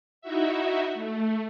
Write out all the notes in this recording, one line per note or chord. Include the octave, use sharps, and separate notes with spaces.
D#4 E4 F#4 E5
A3